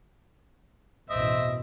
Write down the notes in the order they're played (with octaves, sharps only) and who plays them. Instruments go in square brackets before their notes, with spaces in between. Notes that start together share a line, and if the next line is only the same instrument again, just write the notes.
[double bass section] A1 E2 B2 [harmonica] C4 E5 [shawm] D#5